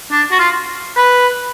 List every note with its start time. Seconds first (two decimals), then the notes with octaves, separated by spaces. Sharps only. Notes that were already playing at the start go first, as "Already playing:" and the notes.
0.11 D4
0.32 F#4
0.39 F4
0.97 B4